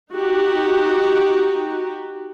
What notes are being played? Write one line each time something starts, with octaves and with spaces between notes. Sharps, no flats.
D#4 F#4 G4